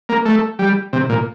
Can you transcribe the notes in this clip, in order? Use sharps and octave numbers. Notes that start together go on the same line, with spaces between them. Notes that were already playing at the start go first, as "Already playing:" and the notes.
A#3
A3
G3
C3
A#2